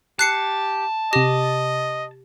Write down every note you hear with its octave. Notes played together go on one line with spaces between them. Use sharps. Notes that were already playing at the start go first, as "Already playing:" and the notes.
G4 A5 F#6 C7 C#7
C3 G4 D#5 A#6